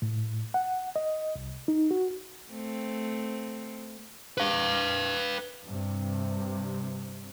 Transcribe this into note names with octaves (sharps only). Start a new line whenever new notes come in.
A2
F#5
D#5
C2
D#4
F#4
A3 C4
B4 F5
G2 C3